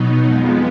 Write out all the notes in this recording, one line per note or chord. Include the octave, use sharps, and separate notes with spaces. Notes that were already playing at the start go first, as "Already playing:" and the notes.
Already playing: B2 F#3 B3 D#4
F2 F3 G#3 B3